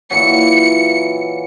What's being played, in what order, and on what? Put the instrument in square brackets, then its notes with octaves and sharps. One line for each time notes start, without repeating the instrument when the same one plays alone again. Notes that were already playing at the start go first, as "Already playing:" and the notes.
[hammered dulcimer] A#2 E3 F#3 [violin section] C#7